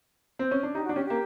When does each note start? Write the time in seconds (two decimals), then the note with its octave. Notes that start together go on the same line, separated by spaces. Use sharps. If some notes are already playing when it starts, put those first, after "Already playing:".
0.39 C4
0.51 C#4
0.63 D4
0.74 D#4 G4
0.85 D4 F#4
0.95 C#4 G4
1.05 A#3 G4